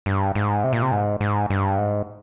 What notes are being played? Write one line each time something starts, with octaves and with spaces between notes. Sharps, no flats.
G2
G#2
C3
A#2
C3
G#2
G#2
G2
G#2